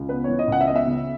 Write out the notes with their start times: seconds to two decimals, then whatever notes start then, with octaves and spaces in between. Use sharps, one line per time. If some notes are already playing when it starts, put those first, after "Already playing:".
Already playing: C#2
0.09 B3 B4
0.24 E3 C#5
0.39 D#5
0.48 C#2 F#5
0.61 E5
0.67 B3 D#5
0.76 E5
0.87 C#3